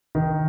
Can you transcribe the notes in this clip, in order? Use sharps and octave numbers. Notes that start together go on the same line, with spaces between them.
D#3